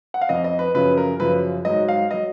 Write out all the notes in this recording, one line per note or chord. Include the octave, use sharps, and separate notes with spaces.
F#5
F5
F2 F3 D#5
D#5
B4
F#2 C#3 F3 B4
A#4
F#2 C#3 F3 B4
G#2 F#3 D#5
F5
F#3 D#5